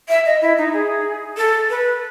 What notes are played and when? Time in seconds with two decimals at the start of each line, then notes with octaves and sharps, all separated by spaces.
0.09 E5
0.26 D#5
0.42 E4
0.58 D#4
0.73 G#4
1.37 A4
1.70 B4